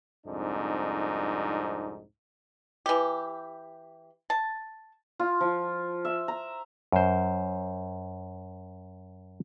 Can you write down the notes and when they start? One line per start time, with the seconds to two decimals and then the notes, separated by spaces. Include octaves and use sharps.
0.26 C2 F2 G#2 D4 D#4
2.86 E3 G4
4.30 A5
5.19 F4
5.40 F3
6.05 E5
6.28 A#5
6.92 F#2 C5